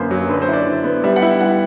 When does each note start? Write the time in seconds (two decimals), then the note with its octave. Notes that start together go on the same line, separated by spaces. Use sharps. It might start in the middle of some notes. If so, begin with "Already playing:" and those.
Already playing: F#2 D3 A#3 B4 C5
0.11 F#3
0.29 D3 B4
0.42 C5
0.48 E4 D5
0.67 D3
0.84 B3
1.04 G3 E5
1.16 F#5
1.22 E4
1.40 G3 F#5